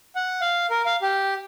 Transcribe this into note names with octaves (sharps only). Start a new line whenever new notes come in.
F#5
F5
A#4
F5
G4